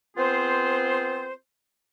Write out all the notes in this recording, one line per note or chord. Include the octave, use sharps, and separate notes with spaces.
B3 C4 F4 G#4 C5